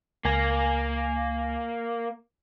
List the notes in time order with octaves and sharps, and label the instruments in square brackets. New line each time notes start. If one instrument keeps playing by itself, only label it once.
[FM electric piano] C#2 G#5 A#6 [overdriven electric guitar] A#3